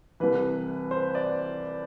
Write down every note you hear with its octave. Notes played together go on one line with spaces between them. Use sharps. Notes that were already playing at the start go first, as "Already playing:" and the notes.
C2 C3 E3 B4
C5
D5